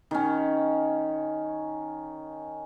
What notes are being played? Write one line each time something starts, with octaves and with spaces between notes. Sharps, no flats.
D#3 C#4